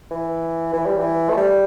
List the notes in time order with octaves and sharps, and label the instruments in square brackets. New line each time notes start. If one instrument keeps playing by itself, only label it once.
[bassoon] E3
E3
G3
E3
A3
G3